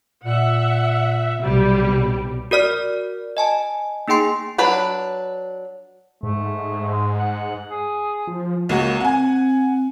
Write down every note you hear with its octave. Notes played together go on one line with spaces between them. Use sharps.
A#2 E5 F#5
B1 C3 G3 G4
F#4 A#4 D5 F6
D#5 G#5 A5
A#3 D#4 G#4 G5 C6 C7
F#3 D4 B4
G#2 A3
G#3
F#5
G#4
F3
C#2 A#3 F#4
C4 F#5 G#5